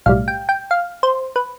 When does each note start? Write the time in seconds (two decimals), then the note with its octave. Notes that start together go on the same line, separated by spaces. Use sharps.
0.06 B1 A2 G3 F5
0.28 G5
0.49 G5
0.71 F5
1.03 C5
1.36 B4